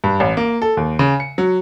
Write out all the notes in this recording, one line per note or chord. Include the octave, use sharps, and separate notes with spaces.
G2
A1
A#3
A4
D#2
C#3
C#7
F#3